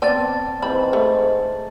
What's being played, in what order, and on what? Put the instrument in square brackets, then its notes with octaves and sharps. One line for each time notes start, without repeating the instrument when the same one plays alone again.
[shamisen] B3 C4 D5 [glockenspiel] A5 A6
[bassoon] G#2 [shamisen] E3 C4 B5
[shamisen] A3